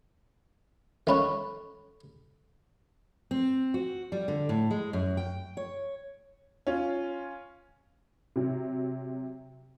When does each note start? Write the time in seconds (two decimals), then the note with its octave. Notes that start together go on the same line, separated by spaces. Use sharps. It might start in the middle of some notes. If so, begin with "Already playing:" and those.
1.07 D#3 C#4 A4 F#5 B5 C#6
3.31 C4
3.74 F#4
4.12 G3
4.28 D3
4.49 A2
4.71 G#3
4.93 F#2
5.17 G5
5.57 C#5
6.67 C#4 F4
8.36 C3 F#3